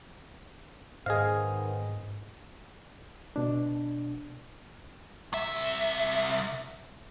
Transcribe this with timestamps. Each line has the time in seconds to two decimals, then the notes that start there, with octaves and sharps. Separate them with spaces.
1.06 G#2 D#3 B3 G#4 C5 D#5 F5 G#5
3.36 B2 D4
5.33 C2 E5